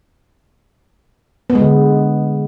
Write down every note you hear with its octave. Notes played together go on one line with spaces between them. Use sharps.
B3
G#3
D3